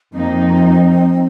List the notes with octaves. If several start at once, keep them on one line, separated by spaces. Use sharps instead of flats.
F2 F3 A#3 C4 D#4